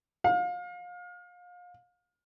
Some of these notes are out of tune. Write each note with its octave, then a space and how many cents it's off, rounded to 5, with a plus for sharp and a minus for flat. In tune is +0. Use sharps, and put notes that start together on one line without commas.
F5 +30